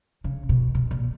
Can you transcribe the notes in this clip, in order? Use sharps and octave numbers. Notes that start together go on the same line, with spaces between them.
C#3
B2
B2
A#2